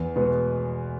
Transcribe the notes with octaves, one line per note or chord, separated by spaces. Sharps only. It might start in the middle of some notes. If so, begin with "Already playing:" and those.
Already playing: E2
B2 G#3 B3